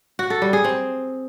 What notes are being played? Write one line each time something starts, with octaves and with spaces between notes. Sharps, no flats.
F#4
A4
G3
G#4
C4